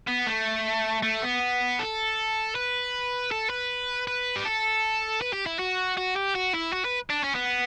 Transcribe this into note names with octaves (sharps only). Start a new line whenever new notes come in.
B3
A3
A3
B3
A4
B4
A4
B4
B4
G4
A4
B4
G4
E4
F#4
F#4
G4
F#4
E4
F#4
B4
D4
C#4
B3